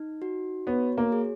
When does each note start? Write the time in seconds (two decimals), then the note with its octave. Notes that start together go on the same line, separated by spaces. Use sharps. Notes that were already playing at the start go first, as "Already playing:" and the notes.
Already playing: D#4
0.22 F#4
0.67 B3 C#5
0.98 A#3
1.12 G#4